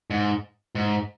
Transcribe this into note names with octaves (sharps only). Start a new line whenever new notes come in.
G#2
G#2